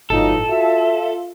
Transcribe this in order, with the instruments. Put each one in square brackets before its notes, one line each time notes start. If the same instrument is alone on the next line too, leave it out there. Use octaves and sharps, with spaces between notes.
[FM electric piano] G1 A2 F4 [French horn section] E3 F#3 D#4 [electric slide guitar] A4
[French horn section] F4 [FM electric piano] F#4 [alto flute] E5